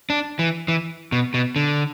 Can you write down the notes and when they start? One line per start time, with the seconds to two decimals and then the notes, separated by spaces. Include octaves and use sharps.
0.10 D4
0.39 E3
0.68 E3
1.12 B2
1.34 B2
1.56 D3